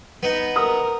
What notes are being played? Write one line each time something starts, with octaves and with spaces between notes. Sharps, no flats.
B3 D#4
A#4 D#6